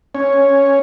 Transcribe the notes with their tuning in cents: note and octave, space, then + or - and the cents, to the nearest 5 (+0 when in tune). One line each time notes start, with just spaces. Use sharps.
C#4 +0 C#5 +0